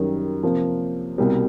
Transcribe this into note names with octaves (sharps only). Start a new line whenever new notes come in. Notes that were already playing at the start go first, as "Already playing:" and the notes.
Already playing: F#2 D#3 G3
C3 F3 A#3
C2 B2 G3 A#3